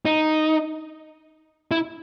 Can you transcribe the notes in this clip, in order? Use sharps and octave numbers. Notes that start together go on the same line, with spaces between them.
D#4
E4